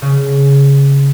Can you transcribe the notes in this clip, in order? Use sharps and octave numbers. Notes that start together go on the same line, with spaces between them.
C#3